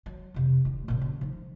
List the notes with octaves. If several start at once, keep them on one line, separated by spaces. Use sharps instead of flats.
F#3
F2 C3
D#1 E4
A#2 C#3
C#3
F3 D#4